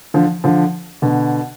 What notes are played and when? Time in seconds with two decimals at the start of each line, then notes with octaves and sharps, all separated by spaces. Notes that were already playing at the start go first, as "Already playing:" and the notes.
0.14 D3 F3
0.44 D3 F3
1.02 B2 D3